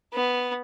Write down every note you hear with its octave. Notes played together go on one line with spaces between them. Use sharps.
B3